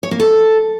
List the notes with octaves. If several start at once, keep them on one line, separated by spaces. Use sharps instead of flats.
C#5
A#3
A4